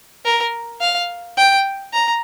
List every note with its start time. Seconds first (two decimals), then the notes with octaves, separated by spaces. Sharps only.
0.25 A#4
0.81 F5
1.37 G5
1.93 A#5